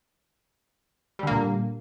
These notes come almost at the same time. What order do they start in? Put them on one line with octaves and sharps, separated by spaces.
G3 D3 A#3 A#2